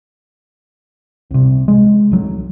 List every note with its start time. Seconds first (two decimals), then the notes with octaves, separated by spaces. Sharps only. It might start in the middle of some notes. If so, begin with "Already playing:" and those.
1.31 C2 C3
1.68 G#3
2.11 C2 F#3